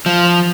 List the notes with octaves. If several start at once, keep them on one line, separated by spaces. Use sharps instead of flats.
F3